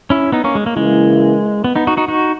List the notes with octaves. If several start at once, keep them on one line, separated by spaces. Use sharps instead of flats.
C#4 E4
B3 D#4
A#3 C#4
G#3
A#3
C#3 E3 G#3 A#3 E4
B3
B3 D#4
D#4 F#4
D#4 F#4
D#4 F#4